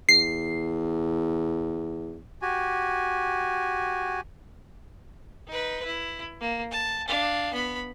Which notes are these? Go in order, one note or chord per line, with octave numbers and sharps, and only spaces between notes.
E2 C7
F#4 G4 G#5
D#4 B4
E4
A#3
A5
D4 F5
B3 B5